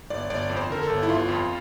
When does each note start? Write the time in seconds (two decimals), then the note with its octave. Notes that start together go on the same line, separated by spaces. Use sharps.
0.10 G1 D5
0.30 G1 D5
0.50 F2
0.57 C5
0.70 D3 A#4
0.83 A4
0.90 G1
1.03 E4
1.09 G1 F4
1.28 F2